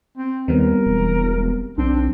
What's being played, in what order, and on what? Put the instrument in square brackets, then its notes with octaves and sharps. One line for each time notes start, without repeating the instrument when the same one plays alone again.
[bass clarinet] C4
[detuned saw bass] D#2 [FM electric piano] G3 B3 C4 [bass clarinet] A#4
[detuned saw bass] E1
[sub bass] B1 [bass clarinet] C4 [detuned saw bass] D4